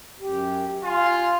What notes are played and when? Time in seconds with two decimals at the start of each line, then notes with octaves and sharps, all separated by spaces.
0.20 F#2 G4
0.84 F4 G#5